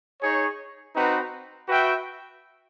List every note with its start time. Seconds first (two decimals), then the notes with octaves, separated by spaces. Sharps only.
0.21 D#4 G#4 C#5
0.94 C4 D#4 F#4 B4
1.68 F#4 B4 E5 G5